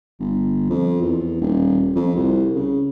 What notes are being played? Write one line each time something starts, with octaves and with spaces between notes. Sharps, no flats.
G1
F2
E2
D#1
F2
C2
C#3